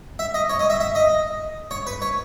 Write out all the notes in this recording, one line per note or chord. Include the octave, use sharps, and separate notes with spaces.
E5
D#5
C#5
D#5
E5
E5
D#5
C#5
B4
C#5